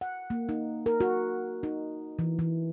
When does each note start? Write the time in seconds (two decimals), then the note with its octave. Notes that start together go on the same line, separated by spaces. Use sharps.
0.01 F#5
0.30 A#3
0.49 D#4
0.86 A#4
1.00 F#4
1.63 D#4
2.19 E3
2.39 E3